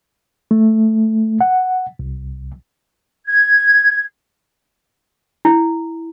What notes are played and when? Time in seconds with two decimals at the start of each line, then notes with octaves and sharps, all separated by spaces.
0.51 A3
1.41 F#5
1.99 C2
3.26 G#6
5.45 E4